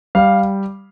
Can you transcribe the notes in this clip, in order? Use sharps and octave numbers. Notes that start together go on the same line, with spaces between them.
G3 F5